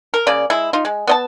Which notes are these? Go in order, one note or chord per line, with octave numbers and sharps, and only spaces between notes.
A#4
C#3 A#3 D5
G#3 E4
D#4 F4
G#3
B3 D#5 A5